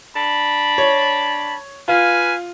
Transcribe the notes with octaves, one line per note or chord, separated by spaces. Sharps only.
D4 A5 B5
C#5
F4 B4 F5 G#5